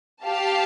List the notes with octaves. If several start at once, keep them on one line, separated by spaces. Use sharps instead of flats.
G4 F5 A5